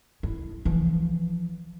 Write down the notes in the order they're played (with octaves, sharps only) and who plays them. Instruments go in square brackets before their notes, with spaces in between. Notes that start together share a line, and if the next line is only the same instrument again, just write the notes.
[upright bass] E4
E3 F3